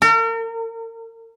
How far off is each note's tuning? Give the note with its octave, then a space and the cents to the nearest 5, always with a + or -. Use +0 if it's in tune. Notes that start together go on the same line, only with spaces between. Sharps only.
A#4 -40